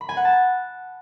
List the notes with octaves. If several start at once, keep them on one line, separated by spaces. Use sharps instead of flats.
B5
G#5
F#5
A5